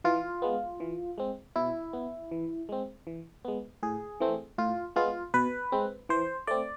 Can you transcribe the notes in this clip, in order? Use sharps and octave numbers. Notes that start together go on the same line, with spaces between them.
E3 F4
G#3 B3
E3
G#3 C4
B2 E4
B3
E3
G#3 C4
E3
G#3 B3
A2 G#4
E3 A3 C4
A2 F4
G#3 B3 F4
B2 B4
G#3 C4
E3 C5
A3 C4 D5